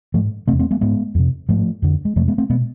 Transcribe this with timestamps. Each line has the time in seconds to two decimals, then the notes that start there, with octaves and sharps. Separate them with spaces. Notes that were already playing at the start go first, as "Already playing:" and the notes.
0.14 G#2 F3 A3
0.47 C3 A3 C4
0.52 E2
0.59 A3 C4
0.71 G#3 B3
0.81 G#2 G#3 B3
1.15 F2 C3
1.49 G#2 F3 A3
1.82 F2 D3
2.05 G#3
2.16 F2 C3 F3 A3
2.28 G#3 B3
2.38 A3 C4
2.50 B2 G#3 B3